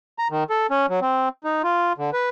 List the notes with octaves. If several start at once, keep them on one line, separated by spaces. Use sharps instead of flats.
A#5
D#3
A4
C#4
F#3
C4
D#4
F4
D3
B4